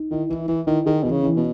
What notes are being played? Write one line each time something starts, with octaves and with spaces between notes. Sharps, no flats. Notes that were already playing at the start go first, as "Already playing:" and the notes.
Already playing: D#4
D#3 E4
E3 E4
E3 E4
D#3 E4
D#3 G#4
B2 E3
C#3
E3
B2